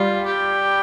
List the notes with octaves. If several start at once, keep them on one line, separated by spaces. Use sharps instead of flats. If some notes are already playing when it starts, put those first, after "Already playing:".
Already playing: G3 F4
G4